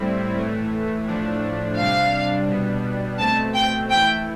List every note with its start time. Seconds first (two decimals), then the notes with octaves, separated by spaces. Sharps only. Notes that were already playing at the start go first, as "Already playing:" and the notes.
Already playing: A2 G3 C4 E4
0.36 A2 E3 A3
1.07 A2 F3 A3 D4
1.78 C3 G3 D4 F5
2.49 B2 G3 B3 D4
3.19 B2 A3 C4 A5
3.55 G5
3.90 E3 A3 E4 G5